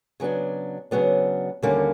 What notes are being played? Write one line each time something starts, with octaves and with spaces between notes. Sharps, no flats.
C#3 F#3 B3 D4
C#3 F#3 B3 D4
D#2 D3 G3 A#3 C#4